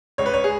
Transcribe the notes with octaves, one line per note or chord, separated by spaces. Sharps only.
C#2 C#5
B4
C#5
G#4